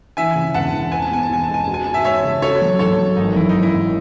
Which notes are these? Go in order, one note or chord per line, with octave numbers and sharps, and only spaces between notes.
E3 E5 G#5
C#3
E1 F#5 A5
E3
C4 G#5
A5
E2 G#5
A5
E2 G#5
G#3 A5
G#5
F#4 A5
G#5
F#4 A5
E5 G#5
G#3 C#5 E5
C#3
F#4 A4 C#5
F#3
G#2 A4 C#5
F#3
G#1 D#4
F#2 E4
D#4
G#1
E4
G#1